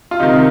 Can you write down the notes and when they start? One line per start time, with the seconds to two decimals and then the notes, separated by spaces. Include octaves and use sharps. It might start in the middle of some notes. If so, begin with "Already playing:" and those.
0.11 F4
0.20 C3 D#3 D#4